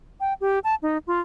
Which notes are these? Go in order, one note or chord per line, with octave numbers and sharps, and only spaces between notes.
G5
G4
A5
D#4
F4